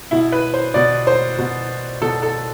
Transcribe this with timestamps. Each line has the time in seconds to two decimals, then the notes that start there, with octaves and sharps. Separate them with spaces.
0.11 B2 E4
0.32 B4
0.54 C5
0.74 B2 D5
1.07 C5
1.39 B2
2.01 B2 A4
2.23 A4